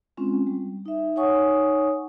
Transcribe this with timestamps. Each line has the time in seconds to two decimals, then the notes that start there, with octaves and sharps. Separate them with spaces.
0.17 G#3 C4 C#4 F4
0.47 G3
0.86 D#4 E5
1.16 D#4 C#5 F#5 G#5 C#6 D#6